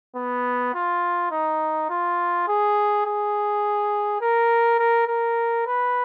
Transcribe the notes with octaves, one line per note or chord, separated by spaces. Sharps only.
B3
F4
D#4
F4
G#4
G#4
A#4
A#4
A#4
B4